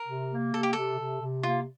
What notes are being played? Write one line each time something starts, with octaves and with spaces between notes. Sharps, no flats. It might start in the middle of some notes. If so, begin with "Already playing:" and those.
Already playing: A#4
C3
A#3
C3 A4
G4
C3 A4
C3
C3
A#3 F4